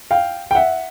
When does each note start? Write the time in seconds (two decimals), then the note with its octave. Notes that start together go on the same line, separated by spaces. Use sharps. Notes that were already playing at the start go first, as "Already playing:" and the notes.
0.11 F5 G5
0.51 G5
0.55 E5 F#5